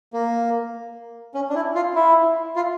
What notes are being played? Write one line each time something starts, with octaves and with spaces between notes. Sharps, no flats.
A#3
C#4
D4
E4
F4
E4
F4